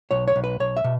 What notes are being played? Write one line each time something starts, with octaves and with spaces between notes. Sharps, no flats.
B1 C#5
C#5
B1
B4
B1 C#5
E5
B2